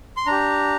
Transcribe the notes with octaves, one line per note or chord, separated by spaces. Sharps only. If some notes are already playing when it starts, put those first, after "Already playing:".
C6
D4 G4 A#5